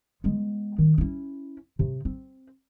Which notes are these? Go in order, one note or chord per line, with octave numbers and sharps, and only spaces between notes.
G#3 B3
D#3
C#4 E4
C3
C4